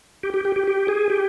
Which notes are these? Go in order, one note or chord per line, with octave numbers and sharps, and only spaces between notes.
G4
G4
G4
G4
G4
G#4
G4